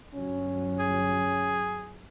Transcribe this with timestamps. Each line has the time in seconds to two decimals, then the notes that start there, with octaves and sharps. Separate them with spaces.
0.14 G1 F#3 C#4
0.79 G#4